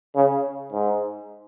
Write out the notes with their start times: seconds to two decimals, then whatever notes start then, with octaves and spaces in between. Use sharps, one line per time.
0.16 C#3
0.73 G#2